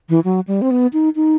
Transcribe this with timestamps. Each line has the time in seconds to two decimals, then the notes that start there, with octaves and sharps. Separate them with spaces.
0.09 E3
0.24 F#3
0.48 G3
0.62 C4
0.71 B3
0.93 D#4
1.16 D#4